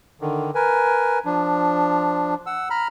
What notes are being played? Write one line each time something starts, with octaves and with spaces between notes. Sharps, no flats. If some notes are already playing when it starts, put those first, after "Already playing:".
D3 D#3
A#4 B4 G#5
F3 D4
F#5 E6
A#5 B5 F6